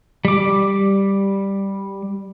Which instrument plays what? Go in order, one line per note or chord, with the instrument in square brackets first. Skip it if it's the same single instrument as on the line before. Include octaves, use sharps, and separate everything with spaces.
[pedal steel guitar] G3 D6